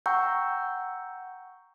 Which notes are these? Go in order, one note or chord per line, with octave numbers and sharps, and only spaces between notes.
F#5 G5 A#5 C#6 E6 G6